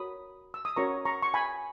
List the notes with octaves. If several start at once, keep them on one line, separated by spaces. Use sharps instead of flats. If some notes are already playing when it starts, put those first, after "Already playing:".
Already playing: F#4 A#4 C#5 B5 D#6
E6
D#6
C#4 F#4 A#4 C#5 A#5 C#6
A#5 C#6
C#6
G#5 B5